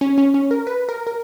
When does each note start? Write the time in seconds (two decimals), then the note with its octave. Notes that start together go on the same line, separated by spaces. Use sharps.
0.01 C#4
0.18 C#4
0.34 C#4
0.51 A#4
0.67 B4
0.89 A#4
1.07 A#4